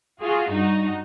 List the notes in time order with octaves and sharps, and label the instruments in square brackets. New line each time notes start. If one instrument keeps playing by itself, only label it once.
[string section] F4 F#4 G#4
G2 D#4 F#4